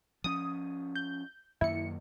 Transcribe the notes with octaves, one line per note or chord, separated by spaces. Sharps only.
F3 C#4 D#6
G6
F#2 D#3 A#3 E4 C#7